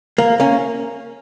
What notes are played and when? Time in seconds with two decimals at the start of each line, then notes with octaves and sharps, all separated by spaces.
0.18 A#3
0.40 A#3 C#4